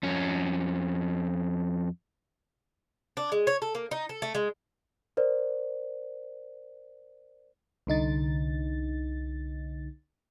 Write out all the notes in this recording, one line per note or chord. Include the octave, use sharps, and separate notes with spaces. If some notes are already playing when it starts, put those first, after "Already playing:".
F2 C#4
D4
G#3
C#5
A4
A#3
D#4
A4
A3
G#3
A#4 C5 D5
C2 D3 D#4 A6